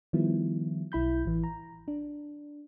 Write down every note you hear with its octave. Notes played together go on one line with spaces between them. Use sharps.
D#3 F3 G3 B3 E4
B1 E4 B5 G6
A1 E3
A#5
D4